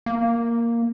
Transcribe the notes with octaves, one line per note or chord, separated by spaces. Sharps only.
A#3